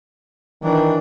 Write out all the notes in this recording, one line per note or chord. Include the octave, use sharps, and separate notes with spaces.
D#3 E3 D4